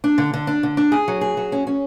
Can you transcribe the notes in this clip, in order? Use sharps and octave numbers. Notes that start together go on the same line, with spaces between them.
D4
D3
D3
D4
D3
D4
G#4
F#3
G#4
F#3
C#4
C#4